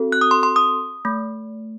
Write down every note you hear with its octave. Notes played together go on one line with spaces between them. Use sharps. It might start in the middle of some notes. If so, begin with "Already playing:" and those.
Already playing: C4 F#4 A4
F#6
D#6
C6
C6
D#6
A3